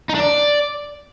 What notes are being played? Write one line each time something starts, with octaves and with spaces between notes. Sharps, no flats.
D#4
D4
D5